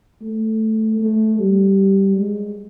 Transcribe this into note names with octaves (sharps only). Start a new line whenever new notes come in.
A3
A3
G3
G#3